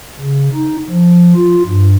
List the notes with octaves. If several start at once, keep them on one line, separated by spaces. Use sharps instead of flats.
C#3
D#4
F3
F4
G2